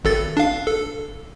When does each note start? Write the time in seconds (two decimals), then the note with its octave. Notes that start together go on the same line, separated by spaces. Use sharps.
0.05 G#1 A4 A6
0.37 D4 F5
0.66 A4